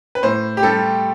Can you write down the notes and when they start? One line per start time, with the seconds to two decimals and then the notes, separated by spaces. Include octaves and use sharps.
0.15 B4
0.23 A2 C5
0.57 G4
0.63 G3 A4